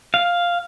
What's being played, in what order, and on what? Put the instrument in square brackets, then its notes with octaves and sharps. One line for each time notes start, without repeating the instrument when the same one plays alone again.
[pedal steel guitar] F5